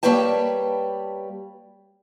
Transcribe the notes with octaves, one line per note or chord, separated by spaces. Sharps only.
G3 A#3 B4 C#5 G5 A5